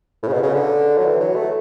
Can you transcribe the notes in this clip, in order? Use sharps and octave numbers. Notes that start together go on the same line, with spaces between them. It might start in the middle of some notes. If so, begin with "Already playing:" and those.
A2
C#3
B2
C#3
D3
F#3
E3
F#3
A3